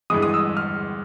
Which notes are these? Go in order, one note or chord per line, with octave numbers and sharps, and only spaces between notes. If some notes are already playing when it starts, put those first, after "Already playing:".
G2 E3 G#3 D#6
D#6
E6
F6